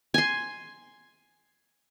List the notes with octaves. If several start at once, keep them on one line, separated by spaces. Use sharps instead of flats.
G#5 C6